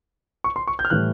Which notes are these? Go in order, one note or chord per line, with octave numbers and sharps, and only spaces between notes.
C#6
C6
C#6
G6
F6
A2 E3 G3 F#6